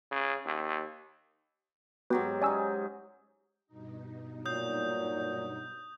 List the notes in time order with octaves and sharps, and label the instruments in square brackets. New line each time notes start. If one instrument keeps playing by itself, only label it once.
[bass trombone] C#3
D#2
[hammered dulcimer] G#2 F#3 G4 [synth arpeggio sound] B3 F#4 B4
[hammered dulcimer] C#4 D#4 [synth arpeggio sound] D5 G#5 E6
[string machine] G2 B2 D#4
[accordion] A#2 [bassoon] F#3 [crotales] D#6 G6